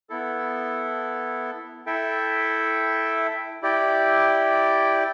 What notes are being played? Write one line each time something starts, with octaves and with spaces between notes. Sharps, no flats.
B3 E4 A4
E4 A4 E5 G5
E4 G4 D5 G5